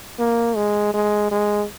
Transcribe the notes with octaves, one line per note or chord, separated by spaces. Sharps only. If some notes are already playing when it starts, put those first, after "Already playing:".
A#3
G#3
G#3
G#3